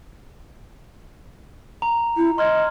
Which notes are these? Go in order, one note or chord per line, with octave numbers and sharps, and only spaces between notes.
A#5
E4
D#5 C6 F6 G#6